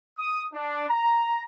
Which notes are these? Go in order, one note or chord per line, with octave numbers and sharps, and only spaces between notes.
D#6
D4
A#5